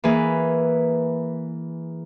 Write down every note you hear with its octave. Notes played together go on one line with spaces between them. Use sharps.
E3 A#3 G#4 B4